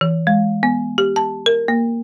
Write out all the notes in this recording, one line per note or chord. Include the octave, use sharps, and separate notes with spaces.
E3
G#3
B3
G4
A5
A#4
A#3